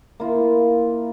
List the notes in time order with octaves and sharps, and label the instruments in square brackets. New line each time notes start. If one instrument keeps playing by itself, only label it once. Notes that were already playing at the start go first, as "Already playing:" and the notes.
[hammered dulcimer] A#3 E4 F4